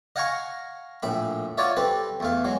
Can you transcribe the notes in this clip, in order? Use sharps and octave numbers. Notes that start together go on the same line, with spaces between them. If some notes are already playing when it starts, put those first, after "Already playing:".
D#5 F5 F#5 G#5 A#5 C#6
A#1 A2 E5 B5
F4 F#4 C#5 D5 E5
G3 C4 A4 B4
E2 A3 F5
F#3 G#3